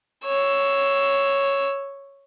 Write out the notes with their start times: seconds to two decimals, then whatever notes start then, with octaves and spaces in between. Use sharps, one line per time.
0.25 C#5 E6